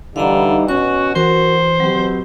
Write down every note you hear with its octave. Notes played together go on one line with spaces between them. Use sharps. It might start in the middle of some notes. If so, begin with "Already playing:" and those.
D3 E3 G3 D#4 F5 F#5 A#5
B2 C#4 F#4 C#6
E3 F#4 A#4 C5
B2 F#3 C4 G4